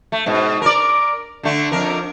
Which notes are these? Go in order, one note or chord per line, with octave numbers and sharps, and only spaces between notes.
A3
G#2 B2
A#4 D5
D3 A3
F2 D4 A#4